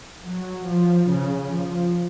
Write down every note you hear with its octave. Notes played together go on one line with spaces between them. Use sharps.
F#3
F3
C#3
F3